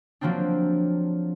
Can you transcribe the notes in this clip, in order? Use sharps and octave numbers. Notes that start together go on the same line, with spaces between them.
F3 F#3 A#3 C4 D4